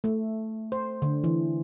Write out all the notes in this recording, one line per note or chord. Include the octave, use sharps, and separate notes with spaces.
A3
C5
D3
E3